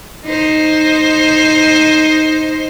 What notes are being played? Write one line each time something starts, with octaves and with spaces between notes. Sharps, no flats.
D#4 C5